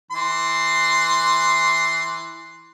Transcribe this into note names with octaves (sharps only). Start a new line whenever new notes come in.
E3 C6